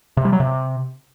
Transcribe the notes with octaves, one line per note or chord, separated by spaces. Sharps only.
C3
G3
F#3
C3